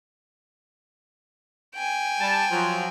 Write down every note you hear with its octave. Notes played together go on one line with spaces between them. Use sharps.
G5 G#5
G3 A5
F3 F#3